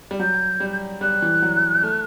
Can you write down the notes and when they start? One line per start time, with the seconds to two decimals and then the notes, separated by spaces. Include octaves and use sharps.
0.11 G3
0.19 F#3 G6
0.60 G3
1.01 G3 F#6
1.22 E3
1.42 F#3
1.83 A3